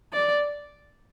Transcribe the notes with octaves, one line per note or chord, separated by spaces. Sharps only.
D5